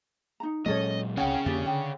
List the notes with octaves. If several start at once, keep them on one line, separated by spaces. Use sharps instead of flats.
D#4 A#5
A#2 F#3 G#3 C#4 A4 C#5 D#5
E1 C2 C#4 G#4 F#5 G5
F2 D3 A#3 G4 D5
D3 G5